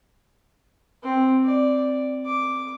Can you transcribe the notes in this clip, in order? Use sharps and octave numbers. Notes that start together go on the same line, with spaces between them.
C4
D5
D6